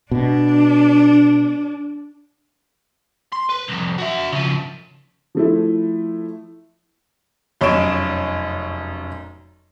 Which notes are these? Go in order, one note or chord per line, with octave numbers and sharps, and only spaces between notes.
B2 D4
C6
B4
C2 F2
F#4 E5
C#3 F3
F3 A3 E4
F1 F#2 C#5 D#5 D7 E7